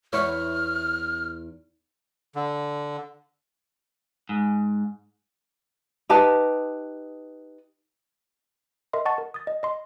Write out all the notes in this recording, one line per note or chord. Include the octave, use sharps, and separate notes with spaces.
E2 E4 C#5 F6
D3
G#2
D#4 G4 B4 A5
A#4 D#5 E5 C6
D#5 F#5 A5 C#6 A6
A#4
D#6 A6
D#5
D#5 C6